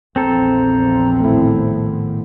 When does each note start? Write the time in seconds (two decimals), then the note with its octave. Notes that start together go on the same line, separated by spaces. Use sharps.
0.16 A#1 E2 F3 C4 A4 A#5
1.20 A2 D#3 A3 B3 E4